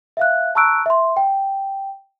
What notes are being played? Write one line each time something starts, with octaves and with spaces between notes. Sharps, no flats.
E5 F5 F#6
A5 A#5 C#6 E6 F#6 D7
E5 C6
G5